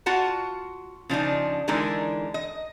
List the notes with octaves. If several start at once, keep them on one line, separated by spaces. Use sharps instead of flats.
F4 F#4 F#5 A5
C#3 F3 D4 D#4
D3 E3 G#3 D4 D#4 A#4
D#5